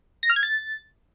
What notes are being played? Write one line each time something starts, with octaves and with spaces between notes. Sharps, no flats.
A#6
F6
G#6
A6